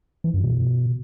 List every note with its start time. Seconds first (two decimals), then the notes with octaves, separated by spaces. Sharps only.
0.24 E3
0.34 F#2
0.44 B2